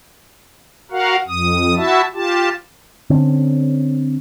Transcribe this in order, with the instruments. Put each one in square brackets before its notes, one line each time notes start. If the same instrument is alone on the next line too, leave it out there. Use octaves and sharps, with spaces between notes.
[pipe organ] F#4 A#4 F5 F#5
F2 D#6
E4 F#4 E5 A5
F4 G4 A5
[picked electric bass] D3 C4 C#4